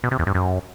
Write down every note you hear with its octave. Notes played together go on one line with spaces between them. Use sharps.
B2
C3
E2
G2
F#2